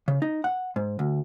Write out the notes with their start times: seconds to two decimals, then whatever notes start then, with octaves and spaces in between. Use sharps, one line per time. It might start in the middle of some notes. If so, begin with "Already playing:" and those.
0.08 C#3
0.22 D#4
0.44 F#5
0.76 G#2
0.99 D2